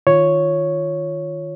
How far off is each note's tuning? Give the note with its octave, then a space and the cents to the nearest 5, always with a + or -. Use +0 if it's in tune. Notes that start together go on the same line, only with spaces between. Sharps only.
D#3 +0 F4 +0 C#5 +0